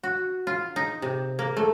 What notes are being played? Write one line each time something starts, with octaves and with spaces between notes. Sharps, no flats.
F#4
F4
D#4
C3
A#3
A3